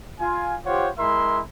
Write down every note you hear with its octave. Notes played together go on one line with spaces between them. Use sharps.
F4 G#5
F4 G4 C5 C#5 F#5
G#3 E4 A#4 E5 C6